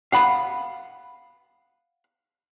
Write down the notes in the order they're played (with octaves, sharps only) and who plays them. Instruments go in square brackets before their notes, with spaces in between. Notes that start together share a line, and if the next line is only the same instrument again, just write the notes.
[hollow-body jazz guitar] F5 F#5 B5